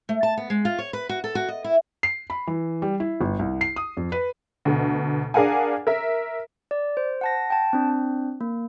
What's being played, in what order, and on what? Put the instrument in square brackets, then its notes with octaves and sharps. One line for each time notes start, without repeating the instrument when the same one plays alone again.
[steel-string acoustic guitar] A3
A5
B3
G#3
F4
C#5
B4
F#4
A4
F#4
D#5
E4
[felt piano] C7
B5
E3
G3
E4
G1
C2
C7
D#6
F2
B4
[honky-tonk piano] D2 B2
D4 G#4 A#4 F5 F#5 G#5
A#4 E5
[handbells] D5
C5
F#5 A5 A#6
G5 A5
C4 D4
A#3